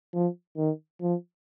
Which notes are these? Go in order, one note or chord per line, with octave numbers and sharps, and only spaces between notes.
F3
D#3
F3